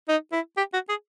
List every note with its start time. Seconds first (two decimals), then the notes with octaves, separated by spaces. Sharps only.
0.08 D#4
0.32 E4
0.57 G4
0.73 F#4
0.89 G#4